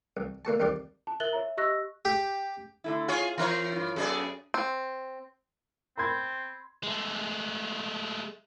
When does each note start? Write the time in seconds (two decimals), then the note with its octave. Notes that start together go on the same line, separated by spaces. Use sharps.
0.17 C2
0.45 D3 A#3 F#4 A5
0.60 C2 F2 D#3 G4 D5
1.07 A5
1.20 A#4 E5 F#6 A6 F#7 G7
1.33 C#5 E5 A#5
1.57 G4 D#5 C#6 E6 F#6 A#6
2.05 G4
2.84 D3 A3 E4
3.08 F4 G#4 C#5 F5
3.38 E3 C4 F4 A#4 C#5 E5
3.72 G2 F4
3.96 F#2 B3 G#4 A4 D5
4.54 C4
5.97 C4 B5 C6 G#6
6.83 G#3 A3